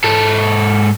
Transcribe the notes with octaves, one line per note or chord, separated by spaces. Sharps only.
G#2 A4